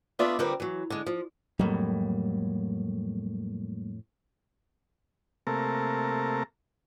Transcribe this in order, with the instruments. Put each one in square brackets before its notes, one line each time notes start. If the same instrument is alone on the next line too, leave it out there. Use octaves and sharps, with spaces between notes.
[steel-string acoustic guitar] A3 B3 D4 F4 D5 E5
D3 F3 G3 C4 A#4 B4
E3 F#3
D3 G#3
F3
[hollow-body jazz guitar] F2 A2 [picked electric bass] F#3 G3 A#3
[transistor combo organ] C3 A3 A#3 A4 A#4